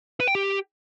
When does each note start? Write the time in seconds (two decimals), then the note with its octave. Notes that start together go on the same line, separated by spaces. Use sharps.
0.20 B4
0.28 G5
0.35 G4